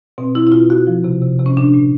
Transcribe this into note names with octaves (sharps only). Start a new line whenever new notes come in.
B2 C4
B2 E4
E4
B2 F4
B2 F#4
F3
C3
C3
C3
C#4
A#2 D4
A#2